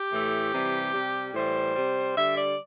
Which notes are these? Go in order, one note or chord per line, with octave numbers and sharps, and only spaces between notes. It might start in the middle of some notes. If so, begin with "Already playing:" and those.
Already playing: G4
A2 E3 A3
C3 E3 G3
C3 G3
A2 E3 G3 C5
C3 G3
D3 G3 E5
D5